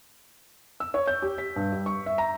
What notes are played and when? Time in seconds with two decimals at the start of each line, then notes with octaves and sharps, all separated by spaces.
0.80 E6
0.94 C#5
1.07 G6
1.22 G4
1.38 B6
1.56 G2
1.72 G3
1.86 C#6
2.06 E5
2.18 A#5